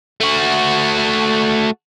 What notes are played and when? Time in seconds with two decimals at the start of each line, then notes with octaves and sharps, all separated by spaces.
0.21 A3 F#4